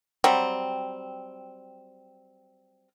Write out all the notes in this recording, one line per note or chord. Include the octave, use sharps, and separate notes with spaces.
F#3 G3 C4